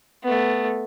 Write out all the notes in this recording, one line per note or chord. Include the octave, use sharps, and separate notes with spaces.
A3 B3